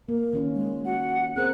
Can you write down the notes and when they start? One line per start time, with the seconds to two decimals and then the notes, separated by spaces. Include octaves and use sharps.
0.09 A#3 A#4
0.33 D#3 C#4 F4
0.54 G#3
0.86 F#4 F#5
1.36 C4 G#4 A#4 C5 F#6